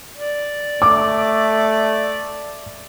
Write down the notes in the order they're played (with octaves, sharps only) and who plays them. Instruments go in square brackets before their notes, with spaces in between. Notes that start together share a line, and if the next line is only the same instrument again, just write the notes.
[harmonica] D5
[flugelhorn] A3 [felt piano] D6